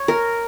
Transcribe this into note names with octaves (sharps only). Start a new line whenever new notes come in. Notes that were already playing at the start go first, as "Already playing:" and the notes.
Already playing: C#5
A#4